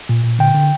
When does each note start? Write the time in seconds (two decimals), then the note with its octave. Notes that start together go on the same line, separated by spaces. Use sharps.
0.09 A#2
0.24 A#2
0.39 D3 G5
0.55 D3